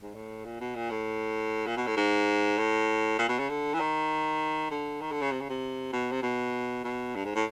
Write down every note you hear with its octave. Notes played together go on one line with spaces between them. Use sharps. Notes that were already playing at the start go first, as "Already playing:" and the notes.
G#2
A2
A#2
B2
A#2
A2
A#2
B2
A2
G#2
A2
A#2
B2
C#3
D3
E3
D#3
D3
D#3
D3
C#3
C3
C#3
C3
B2
C3
B2
B2
G2
G#2
A2